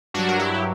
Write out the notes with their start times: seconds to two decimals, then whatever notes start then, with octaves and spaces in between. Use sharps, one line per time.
0.14 G2 F#3 D4 F#4
0.28 A#4
0.39 E4 G4
0.54 G4